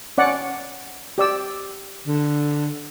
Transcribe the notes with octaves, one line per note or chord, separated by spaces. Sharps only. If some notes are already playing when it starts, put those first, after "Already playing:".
C#4 D5 F#5
G4 D5 E6
D3